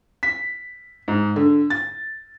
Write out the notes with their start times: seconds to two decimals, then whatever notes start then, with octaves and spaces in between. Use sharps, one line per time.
0.23 B6
1.08 G#2
1.36 D3
1.70 A6